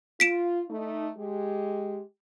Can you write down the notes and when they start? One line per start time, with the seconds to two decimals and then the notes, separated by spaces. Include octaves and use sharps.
0.20 F4 B6 D7 E7
0.69 A3 D#4
1.18 G#3 G4